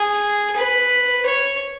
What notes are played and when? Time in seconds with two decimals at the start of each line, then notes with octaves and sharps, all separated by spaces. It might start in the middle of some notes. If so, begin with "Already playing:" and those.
Already playing: G#4
0.56 B4
1.26 C#5